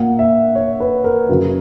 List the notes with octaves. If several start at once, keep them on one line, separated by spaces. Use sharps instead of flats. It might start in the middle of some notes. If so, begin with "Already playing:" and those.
Already playing: A#2 A#3 F#5
E5
C#5
B4
A#4
F#2 C#3 F#3